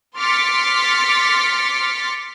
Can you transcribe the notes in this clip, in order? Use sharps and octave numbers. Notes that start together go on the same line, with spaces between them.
C6 D6 F6 A6 B6 C#7